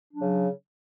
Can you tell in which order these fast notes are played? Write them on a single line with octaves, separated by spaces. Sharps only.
D4 F#3 C#3